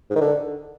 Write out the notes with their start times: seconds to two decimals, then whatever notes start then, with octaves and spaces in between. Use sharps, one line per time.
0.10 G#2
0.16 D#3
0.21 D3